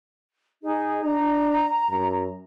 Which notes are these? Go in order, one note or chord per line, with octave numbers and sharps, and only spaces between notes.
D#4 G#4
D4 A#5
F#2